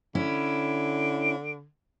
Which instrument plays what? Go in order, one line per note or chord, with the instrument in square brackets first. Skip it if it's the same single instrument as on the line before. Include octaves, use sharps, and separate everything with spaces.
[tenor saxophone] D3 [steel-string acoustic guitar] C#4 E4